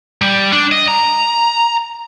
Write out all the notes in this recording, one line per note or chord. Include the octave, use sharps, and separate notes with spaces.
G3
D4
D#5
A#5